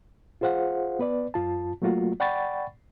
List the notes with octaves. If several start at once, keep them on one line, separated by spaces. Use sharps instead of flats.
F4 G#4 C5 F5 F#5
B3 B4 D5
F#2 F4 A5
F#3 A3 A#3 F4 F#4
D5 F#5 G5 B5 C#6 A6